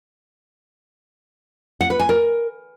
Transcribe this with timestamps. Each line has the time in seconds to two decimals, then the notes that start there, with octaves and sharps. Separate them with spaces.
1.81 F#5
1.90 B4
1.99 G#5
2.09 A#4